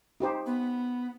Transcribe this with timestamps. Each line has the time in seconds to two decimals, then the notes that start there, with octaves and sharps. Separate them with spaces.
0.20 D#4 G4 C5
0.46 B3